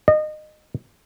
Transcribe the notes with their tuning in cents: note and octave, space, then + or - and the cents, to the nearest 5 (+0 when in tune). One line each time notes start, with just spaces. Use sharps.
D#5 -25